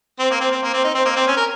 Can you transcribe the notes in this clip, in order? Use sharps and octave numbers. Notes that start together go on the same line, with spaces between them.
C4
A#3
C4
C4
A#3
C4
D#4
C4
A#3
C4
C#4
A#4